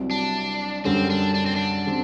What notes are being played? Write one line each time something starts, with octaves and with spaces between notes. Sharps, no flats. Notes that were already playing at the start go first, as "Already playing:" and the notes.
Already playing: C2 C3 F#3
D4
F#2 D3 G3 C4
D4
D4
C4
D4
D3 G3 C4